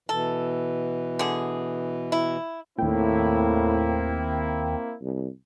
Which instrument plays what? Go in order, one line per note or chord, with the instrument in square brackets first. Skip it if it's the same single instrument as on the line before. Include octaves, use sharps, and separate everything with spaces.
[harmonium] B2 E3 [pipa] A4
[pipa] D3 G#4
E4
[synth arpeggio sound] D#2 G5 [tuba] A2 [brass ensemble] A#3 C4 E4
[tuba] C2